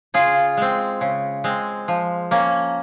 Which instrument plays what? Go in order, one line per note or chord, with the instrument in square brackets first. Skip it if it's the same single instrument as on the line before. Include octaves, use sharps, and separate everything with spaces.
[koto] C#3 F4 G#4
G#3 C4
C#3
G#3 C4
F3
A#3 C#4